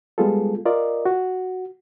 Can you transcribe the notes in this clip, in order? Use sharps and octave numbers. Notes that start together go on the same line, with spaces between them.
G3 G#3 B3 F4 G#4 A4
F4 A#4 D5 D#5
F#4